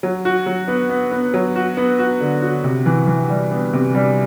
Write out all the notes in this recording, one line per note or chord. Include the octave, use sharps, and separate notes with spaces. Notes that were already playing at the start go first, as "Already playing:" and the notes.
F#3
F#4
F#3
B3
B3
B3
F#3
F#4
B3
F#4
D3
F#4
C3
E3
E3
G3
B3
C3
G3